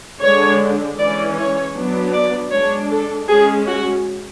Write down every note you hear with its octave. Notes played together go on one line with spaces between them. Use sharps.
D3 G#3 D4 C#5
E3 G#3 C#4 D5
C#5
F#3 B3 D4
D5
G#3 D4 C#5
A4
G#3 C#4 G#4
F#4